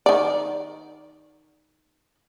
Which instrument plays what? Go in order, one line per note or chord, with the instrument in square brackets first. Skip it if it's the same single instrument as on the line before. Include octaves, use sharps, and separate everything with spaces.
[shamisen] D#3 D5